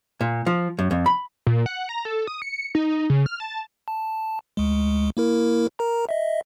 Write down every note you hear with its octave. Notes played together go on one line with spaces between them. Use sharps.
A#2
F3
F#2
F2
B5
A#2
F#5
A#5
A4
D#6
C#7
D#4
C#3
F6
A5
A5
D2 G#3
A#3 E4 A#4
A#4 A#5
D#5 E5